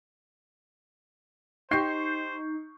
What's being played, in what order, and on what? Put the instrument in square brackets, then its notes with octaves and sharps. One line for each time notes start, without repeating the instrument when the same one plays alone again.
[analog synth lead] D#4 [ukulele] G4 D#5 G5 [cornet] C5 [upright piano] C#6 G6 C7